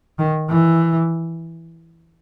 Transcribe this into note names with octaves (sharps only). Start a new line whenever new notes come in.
D#3
E3